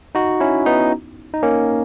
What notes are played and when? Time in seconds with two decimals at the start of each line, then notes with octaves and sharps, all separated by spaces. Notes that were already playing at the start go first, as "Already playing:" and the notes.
0.15 D#4 F#4
0.40 C#4 E4
0.66 B3 D#4
1.34 D#4
1.43 A#3 C#4